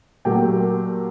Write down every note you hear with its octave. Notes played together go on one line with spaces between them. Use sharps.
A#2 F#3 A3 G4 G5